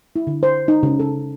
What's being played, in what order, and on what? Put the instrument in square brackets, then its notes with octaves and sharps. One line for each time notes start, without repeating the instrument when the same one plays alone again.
[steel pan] E4
D3
C5
D#4
C#3
A4